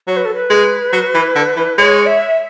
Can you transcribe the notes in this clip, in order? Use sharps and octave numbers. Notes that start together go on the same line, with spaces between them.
F#3 C#5
B4
A4
B4
G#3
F#3
E3
D3
E3
G#3 C#5
E5